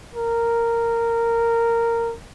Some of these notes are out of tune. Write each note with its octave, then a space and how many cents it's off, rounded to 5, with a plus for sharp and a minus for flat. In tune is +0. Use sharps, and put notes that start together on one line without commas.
A#4 -10